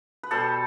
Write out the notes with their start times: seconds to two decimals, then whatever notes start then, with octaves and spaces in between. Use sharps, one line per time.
0.23 B4
0.31 B2 G3 A4 C5